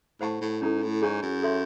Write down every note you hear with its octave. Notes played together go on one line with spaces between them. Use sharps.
A2 C5 F#5 A5 C#6
A2
G#2 C#4 E4 A4
A2
G#2 G#4 C#5 G#5 C#6
F#2
A4 C#5 E5 C6